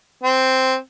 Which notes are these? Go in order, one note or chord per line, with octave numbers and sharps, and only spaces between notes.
C4